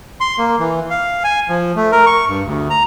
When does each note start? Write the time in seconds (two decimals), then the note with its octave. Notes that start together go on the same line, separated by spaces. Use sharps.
0.21 C6
0.38 A#3
0.59 E3
0.90 F5
1.24 G#5
1.49 F3
1.76 A3
1.92 A#4
2.06 C#6
2.28 G2
2.44 D2
2.70 A#5